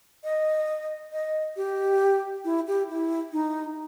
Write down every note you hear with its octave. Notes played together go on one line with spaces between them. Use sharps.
D#5
D#5
G4
E4
G4
E4
D#4